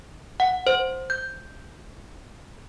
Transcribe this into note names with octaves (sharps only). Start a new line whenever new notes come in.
F#5
C5
G6